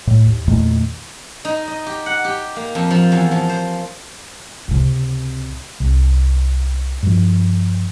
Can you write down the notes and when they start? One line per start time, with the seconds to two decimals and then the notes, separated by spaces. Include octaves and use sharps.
0.07 A2
0.26 D#2
0.48 E2 A#2 D#3 A3
1.45 D#4
1.68 D#5
1.86 G4
2.06 F#5
2.24 G4
2.56 A#3
2.75 F2
2.91 F3
3.12 E2
3.31 F3
3.49 C5
4.68 C#2 C3
5.80 C2
7.03 G2 F3